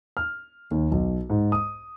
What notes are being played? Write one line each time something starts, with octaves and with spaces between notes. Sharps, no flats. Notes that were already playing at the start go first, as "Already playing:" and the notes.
F6
D#2
B1
G#2
D#6